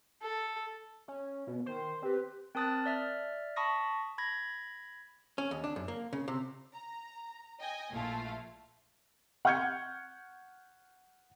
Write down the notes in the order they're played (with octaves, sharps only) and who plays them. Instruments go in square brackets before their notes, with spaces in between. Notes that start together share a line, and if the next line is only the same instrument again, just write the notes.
[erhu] A4
[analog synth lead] C#4
B2
[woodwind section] D#3 [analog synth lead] C5
[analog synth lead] C4 [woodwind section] G4 B4
[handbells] C4 A#4 A5 D#6 F#6 A6
D5 E5 F6
A5 B5 C#6 D#6 A#6
B5 G#6 A#6
[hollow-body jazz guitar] C#4
D#2
D4
F#2
A#3
C#3
C3
[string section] A#5
D#5 G5 G#5
A#1 A#2 A3 E4 F4 F5
[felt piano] F#5 C#6 F6 G6 G#6 C#7